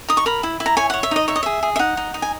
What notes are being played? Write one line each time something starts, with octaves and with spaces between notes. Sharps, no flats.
D#4 D#6
C#6
A#4 B5
E4
E4
A#5
C#5 G#5
C#5 F#5
E5
D#4 D#5
C#5 E5
D#5
G#4 E5
G#4
E5
D#4 F#5
D#4
D#4
G#5